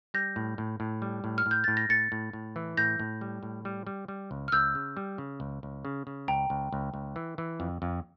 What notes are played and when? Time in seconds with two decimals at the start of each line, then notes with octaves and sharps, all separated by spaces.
0.14 G3 G6 A#6
0.36 A2
0.58 A2
0.80 A2
1.02 G3
1.24 A2
1.38 F6
1.46 A2
1.51 G6
1.64 A2 A6
1.77 A#6
1.89 A2 A6 C#7
2.12 A2
2.33 A2
2.56 E3
2.77 A2 G6 A#6
3.00 A2
3.21 G3
3.43 A2
3.65 G3
3.87 G3
4.08 G3
4.31 C#2
4.48 F6
4.52 C#2 E6 G6
4.75 C#3
4.97 G3
5.18 C#3
5.40 C#2
5.63 C#2
5.85 C#3
6.07 C#3
6.28 C#2 G5 A#5
6.50 C#2
6.73 C#2
6.94 C#2
7.16 E3
7.38 E3
7.60 F2
7.82 F2